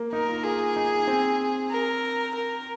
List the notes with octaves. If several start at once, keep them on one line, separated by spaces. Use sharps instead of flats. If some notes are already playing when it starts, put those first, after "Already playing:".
Already playing: A#3
D#4 A#4
F4
F4 G#4
D#4
C4
A#4
A#4